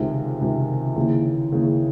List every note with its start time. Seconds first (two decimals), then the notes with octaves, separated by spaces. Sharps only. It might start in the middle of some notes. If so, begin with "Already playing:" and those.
Already playing: C#2 C3 D#3 G#4
0.41 C#2 C3 D#3
0.96 D#2 C#3 E3
1.51 D#2 C#3 E3